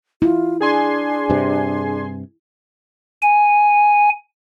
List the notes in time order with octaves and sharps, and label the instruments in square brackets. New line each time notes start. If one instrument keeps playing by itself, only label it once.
[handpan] E4 [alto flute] F4
[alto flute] D4 [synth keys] G#4 G#5 C6
[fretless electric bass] G2 C3
[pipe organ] G#5